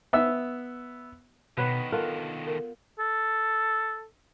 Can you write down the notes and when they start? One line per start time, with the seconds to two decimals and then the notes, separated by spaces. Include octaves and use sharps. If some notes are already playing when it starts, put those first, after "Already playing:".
0.13 B3 E5 E6
1.57 B2 D3 D#3 B3 B4 C#5
1.92 F4 A4 A#4 F#5
2.47 A#4
2.99 A4